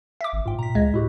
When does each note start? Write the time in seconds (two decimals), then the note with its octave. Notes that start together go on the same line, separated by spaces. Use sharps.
0.21 E5 D6
0.33 G#1
0.46 G#2 F4 G5
0.59 A#2 A#5 B6
0.75 C#2 G#3
0.94 A2 E4 F#4 G4